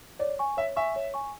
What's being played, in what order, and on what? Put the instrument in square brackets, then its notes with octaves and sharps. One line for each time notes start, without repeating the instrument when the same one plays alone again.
[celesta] C#5 [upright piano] D5
[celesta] G#5 C#6
[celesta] C#5 [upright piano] E5
[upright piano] E5 [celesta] G#5 C#6
[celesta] C#5
G#5 C#6